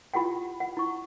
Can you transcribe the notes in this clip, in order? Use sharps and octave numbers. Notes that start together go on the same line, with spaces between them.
E4 F4 G4 F#5 G5
F#5
E4 C#6